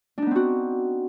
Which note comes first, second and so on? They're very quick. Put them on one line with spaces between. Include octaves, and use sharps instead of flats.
D4 D#4 B3 C4 F#4